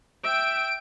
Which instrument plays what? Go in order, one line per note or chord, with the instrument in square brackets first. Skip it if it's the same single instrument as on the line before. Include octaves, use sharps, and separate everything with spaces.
[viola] E5 G5 [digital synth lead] D7